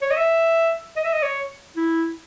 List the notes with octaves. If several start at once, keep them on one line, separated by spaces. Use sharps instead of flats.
C#5
D#5
E5
D#5
E5
D#5
C#5
E4